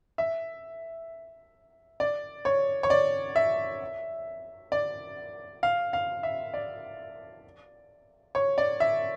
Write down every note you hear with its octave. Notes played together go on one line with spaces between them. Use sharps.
E5
D5
C#5
C#5
D5
E5
D5
F5
F5
E5
D5
C#5
D5
E5